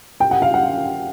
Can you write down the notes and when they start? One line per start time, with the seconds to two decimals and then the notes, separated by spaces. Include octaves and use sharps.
0.20 G5
0.31 F#5
0.42 F5
0.54 F#5